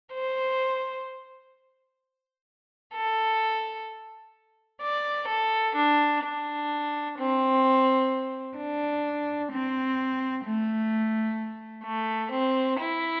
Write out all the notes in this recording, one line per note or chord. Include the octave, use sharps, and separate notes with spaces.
C5
A4
D5
A4
D4
D4
C4
D4
C4
A3
A3
C4
E4